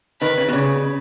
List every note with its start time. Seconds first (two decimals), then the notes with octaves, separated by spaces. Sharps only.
0.21 D#3 B4
0.37 C#3
0.49 B2
0.53 C#3